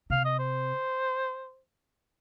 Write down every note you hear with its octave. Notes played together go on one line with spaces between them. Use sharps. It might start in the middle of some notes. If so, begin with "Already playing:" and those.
C3 F5
D#5
C5